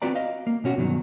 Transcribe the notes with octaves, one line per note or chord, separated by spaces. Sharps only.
C4 F4 F#4 B4 D5 A#5
D#5 F5
A#3
B2 C#4 F#4
G2 B2 D#3 F#3